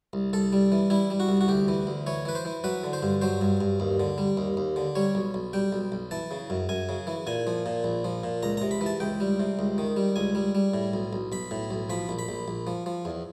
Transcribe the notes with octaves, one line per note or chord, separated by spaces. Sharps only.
C2
C2 A4
G3
E3
G3 E4
G3
F#4
C2
F#4
D2 G4
E3
D2
E3 C#5
E3 B4
C5
E3
F#3 B4
D3
C5
G2
F#3 C5
G2
G2
D#2
D3
G3
D#2
D#2
D3
G3 C#5
B1
B1
G3 G5
B1
B1
E3 A5
C#3
F#2
F#2 G#5
C#3
E3
A#2 G#5
F3
A#2
A#1
F3
A#2
C#2 A#5
C3 A#5
B5
E3
A5
C#2 G5
G3
C3
C#2
D#3
G3
C#2 G#5
G3
G3
A2
B1
B1
B1 B5
A2
B1
F3 B5
A#1
B5
A#1
A#1
F3
F3
E2